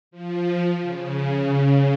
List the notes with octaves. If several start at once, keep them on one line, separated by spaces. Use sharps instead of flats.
F3
C#3